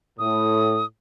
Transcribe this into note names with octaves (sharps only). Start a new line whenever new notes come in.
A2 D#6